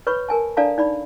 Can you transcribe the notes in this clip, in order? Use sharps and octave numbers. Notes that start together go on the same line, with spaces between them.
B4 C#5 B5 C#6
A#4 G#5 A5
D4 A4 D5 F5 A5 A#5
D#4 D5 B5